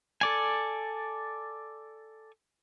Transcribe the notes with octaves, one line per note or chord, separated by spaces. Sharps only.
A4 D5 G#5